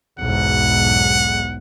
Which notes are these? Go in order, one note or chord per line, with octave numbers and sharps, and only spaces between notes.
B1 E2 G#2 F#5